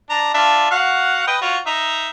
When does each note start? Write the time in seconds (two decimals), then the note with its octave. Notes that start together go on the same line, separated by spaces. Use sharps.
0.10 D4 A#5
0.34 D4 F4 E5
0.71 F#4 F5 F#5
1.27 B4 D#5 G5
1.42 F4 F#4 C#5
1.66 D#4 E5 A#5